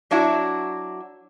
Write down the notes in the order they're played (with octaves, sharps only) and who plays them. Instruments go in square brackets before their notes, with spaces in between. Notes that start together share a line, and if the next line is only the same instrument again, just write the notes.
[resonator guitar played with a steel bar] F#3 D4 E4 F#4